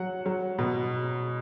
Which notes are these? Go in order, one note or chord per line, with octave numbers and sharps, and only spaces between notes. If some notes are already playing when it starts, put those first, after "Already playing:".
Already playing: F#3 F#5
F#3
B2